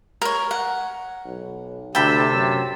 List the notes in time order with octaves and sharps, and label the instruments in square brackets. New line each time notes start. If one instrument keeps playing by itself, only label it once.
[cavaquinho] A#4 C#5
F#5
[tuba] B1
[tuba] D2 [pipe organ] C3 A5 E6 [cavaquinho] G5 B5
[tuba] F#2